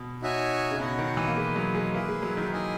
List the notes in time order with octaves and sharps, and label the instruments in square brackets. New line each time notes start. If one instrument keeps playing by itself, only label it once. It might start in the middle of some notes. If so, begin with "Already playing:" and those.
Already playing: [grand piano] B2
[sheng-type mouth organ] D#4 F#4 C#5 E5 G#5
[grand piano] C#3
[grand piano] B2 [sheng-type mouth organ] D#4 F#4 C#5 F#5
[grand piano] D#3
E3
A#3
[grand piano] G#3 [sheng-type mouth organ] G#4 B4 D#5
[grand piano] F#3
G#3
[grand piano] A#3 [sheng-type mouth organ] E4 G#4 B4
[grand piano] G#3
F#3
D#3
[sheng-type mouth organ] E4 G#4 D#5 G#5